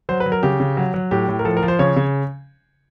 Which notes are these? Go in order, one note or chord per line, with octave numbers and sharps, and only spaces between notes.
F#3 C5
B4
F#3
A#4
C#3 G4
C#3
F#3
F#3
A2 G4
A2
A#4
F3 A4
A#4
F3
C5
C#3 C#5
C#3